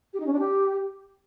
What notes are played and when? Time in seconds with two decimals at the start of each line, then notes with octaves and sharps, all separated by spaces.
0.14 G4
0.20 D#4
0.26 C#4
0.33 D4
0.39 G4